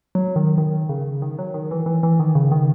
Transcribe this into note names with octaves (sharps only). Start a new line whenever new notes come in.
F#3
D#3
D#3
C#3
D#3
F#3
D#3
E3
E3
E3
D#3
C#3
D#3